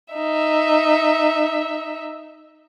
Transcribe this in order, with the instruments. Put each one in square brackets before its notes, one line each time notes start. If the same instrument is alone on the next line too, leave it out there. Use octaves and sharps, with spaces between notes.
[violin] D#4 E5